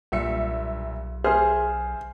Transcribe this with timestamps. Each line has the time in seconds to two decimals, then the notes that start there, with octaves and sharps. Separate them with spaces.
0.12 B1 G2 A#2 E5 C#7
1.24 G#4 C5 E5 C6 F6